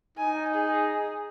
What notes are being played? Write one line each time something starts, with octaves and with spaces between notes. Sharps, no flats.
D#4 G#5
G#4